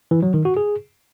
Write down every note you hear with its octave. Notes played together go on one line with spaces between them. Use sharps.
E3
F#3
D#3
F#4
G#4